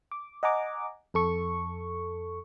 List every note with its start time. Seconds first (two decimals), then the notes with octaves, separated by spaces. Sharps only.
0.12 D6
0.43 D#5 F#5 G#5 A#5 D6
1.14 F2 A4 C#6